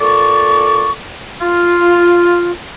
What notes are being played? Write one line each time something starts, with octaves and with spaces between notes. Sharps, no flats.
A#2 A4 D5 C#6
F4